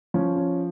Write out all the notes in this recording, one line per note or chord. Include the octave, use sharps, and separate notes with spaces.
F3 C#4
C#4